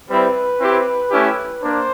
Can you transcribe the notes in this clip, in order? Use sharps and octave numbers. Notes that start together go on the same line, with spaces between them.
G3 C4 E4 B4
C4 E4 G4
A3 C#4 E4 G4
A#3 D4 C5